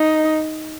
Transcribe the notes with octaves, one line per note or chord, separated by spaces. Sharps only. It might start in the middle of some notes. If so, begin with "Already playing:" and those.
Already playing: D#4